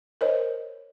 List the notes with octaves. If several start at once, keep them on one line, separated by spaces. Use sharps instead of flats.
A#4 C5 C#5 D#5